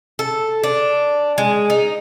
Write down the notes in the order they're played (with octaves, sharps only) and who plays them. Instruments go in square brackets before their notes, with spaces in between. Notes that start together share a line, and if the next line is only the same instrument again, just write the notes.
[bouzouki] A4
D4
G#3
D#4